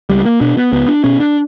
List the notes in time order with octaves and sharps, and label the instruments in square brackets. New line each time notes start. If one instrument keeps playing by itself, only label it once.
[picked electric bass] C#2 G3
A#3
B2 D4
B3
C#2 B3
D4
B2 C#4
D4